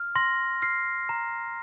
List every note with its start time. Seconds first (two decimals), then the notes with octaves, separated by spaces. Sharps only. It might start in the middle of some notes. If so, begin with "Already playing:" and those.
Already playing: F6
0.15 C6 A#6
0.62 F6 C7
1.09 A#5